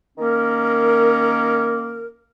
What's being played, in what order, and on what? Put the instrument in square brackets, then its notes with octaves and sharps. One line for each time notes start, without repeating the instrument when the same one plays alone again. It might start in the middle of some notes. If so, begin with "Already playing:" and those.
[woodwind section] D#3 A#3 C#4 A#4